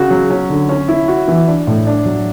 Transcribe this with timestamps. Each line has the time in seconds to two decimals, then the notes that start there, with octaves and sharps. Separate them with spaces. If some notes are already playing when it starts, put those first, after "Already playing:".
Already playing: C#3 F#4
0.11 F#3
0.30 C#4
0.49 D3
0.69 C#4
0.88 E4
1.08 F#4
1.28 E3
1.47 D4
1.67 A2
1.87 D4
2.06 F#3